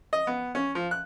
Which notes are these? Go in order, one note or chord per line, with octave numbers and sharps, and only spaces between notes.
D#5
B3
C#4
F3
F#6